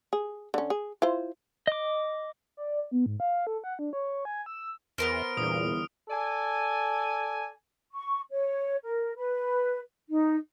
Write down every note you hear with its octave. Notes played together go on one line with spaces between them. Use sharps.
G#4
D3 C#4
G#4
E4 F4 C5
D#5 D6
D5
B3
G#2
F5
A4
F#5
D4
C#5
G#5
E6
E2 B3 A#4 C5 F6 D7
G1 E2 A#2 D#6
A4 D5 G#5
C#6
C#5
A#4
B4
D#4